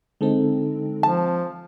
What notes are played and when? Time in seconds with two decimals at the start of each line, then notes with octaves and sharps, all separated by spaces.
0.21 D3 G#3 C4 D#4 A4
1.03 F3 A5